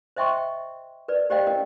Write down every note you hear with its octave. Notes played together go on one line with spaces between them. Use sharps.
C5 D#5 E5 G5 C6 C#6
A#4 B4 D5
G4 C5 D5 D#5 F5 G5
C#4 A#4 D#5 G5